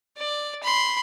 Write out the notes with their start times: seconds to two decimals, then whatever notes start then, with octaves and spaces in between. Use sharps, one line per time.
0.17 D5
0.63 B5 C6